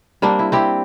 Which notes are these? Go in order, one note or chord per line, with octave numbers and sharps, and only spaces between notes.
G3 A#3 C4 D4
E4
C4 E4 G4